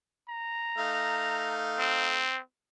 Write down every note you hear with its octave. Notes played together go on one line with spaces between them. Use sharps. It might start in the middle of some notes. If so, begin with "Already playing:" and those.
A#5
A3 D#4 F5
C4